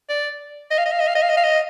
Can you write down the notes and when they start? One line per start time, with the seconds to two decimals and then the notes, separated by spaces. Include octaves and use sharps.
0.09 D5
0.71 D#5
0.78 F5
0.86 D#5
0.93 F5
1.00 D#5
1.08 F5
1.15 D#5
1.23 F5
1.30 D#5
1.37 F5
1.44 D#5